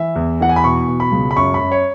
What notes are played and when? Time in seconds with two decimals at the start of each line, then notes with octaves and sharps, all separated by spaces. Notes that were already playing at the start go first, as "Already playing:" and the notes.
Already playing: E3 E5
0.15 E2
0.41 E3 F#5
0.49 G#5
0.56 B5
0.64 B2 C#6
0.88 B2
1.00 B5
1.11 C#2
1.31 B5
1.37 F#2 C#6
1.54 B5
1.60 F#2
1.72 C#5